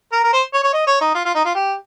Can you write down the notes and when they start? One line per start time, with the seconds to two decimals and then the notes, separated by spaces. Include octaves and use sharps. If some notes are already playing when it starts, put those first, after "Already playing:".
0.13 A#4
0.24 A#4
0.33 C5
0.53 C#5
0.64 C#5
0.74 D#5
0.87 C#5
1.01 D#4
1.15 F4
1.25 F4
1.35 D#4
1.45 F4
1.55 G4